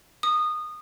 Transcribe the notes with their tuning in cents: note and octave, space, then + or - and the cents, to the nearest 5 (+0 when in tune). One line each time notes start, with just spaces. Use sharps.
D#6 -20